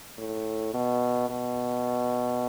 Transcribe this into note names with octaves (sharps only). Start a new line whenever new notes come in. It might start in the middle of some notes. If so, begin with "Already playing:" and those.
A2
B2
B2